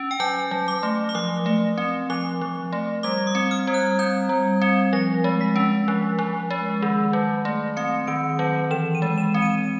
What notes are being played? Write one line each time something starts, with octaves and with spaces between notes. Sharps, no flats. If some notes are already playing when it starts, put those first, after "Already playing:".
Already playing: C#4
G5
F#3 G#5
F#3
D6
A3
D6
F3 D#6
A3
C4
F3 D6
F3
A3
G3 D6
D#6
C4
F6
G3
F#6
C4 G6
G3
C4
F3 A#6
G#3
B6
C#4
F3
F3
G#3
D#3
F#3
A3
C4 C#7
D#3 D7
F#3
E3 E7
D#7
G#3
E7
C4
D#7